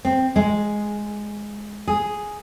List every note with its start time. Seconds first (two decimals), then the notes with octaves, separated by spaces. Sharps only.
0.05 C4
0.36 G#3
1.88 G#4